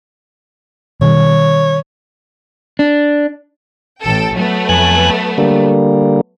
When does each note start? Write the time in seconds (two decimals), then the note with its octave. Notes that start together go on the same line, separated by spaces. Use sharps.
1.01 B2 D#3 G3 C#5
2.79 D4
4.01 A1 A4 G5
4.35 F#3 A3 B3
4.69 F2 G#5 F#6
5.38 D3 G3 A#3